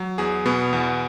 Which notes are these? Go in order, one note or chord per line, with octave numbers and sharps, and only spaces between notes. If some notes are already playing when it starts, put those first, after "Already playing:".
Already playing: F#3
E2 G#4
B2 B3
E2